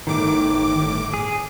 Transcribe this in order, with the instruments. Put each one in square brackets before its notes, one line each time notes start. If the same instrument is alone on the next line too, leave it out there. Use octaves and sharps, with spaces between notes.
[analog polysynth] G1 A2 D6 [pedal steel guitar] D#3
[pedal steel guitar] G#4